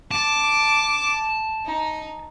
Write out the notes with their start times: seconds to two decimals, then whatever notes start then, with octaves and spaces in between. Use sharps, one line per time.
0.11 A5 D6
1.65 D#4